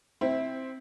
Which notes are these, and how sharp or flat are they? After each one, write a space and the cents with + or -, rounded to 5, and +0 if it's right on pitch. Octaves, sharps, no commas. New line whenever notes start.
C4 +0 E4 -15